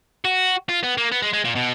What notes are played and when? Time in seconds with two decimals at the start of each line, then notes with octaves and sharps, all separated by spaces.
0.25 F#4
0.69 F4
0.83 B3
0.97 A#3
1.11 B3
1.22 G#3
1.33 G#3
1.44 A#2
1.55 B2